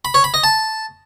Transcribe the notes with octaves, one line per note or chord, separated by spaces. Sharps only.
B5
C#5
B5
D#5
A5